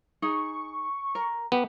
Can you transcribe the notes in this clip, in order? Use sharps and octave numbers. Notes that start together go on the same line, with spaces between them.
D#4 G#4 C#6
A#4
B3 G4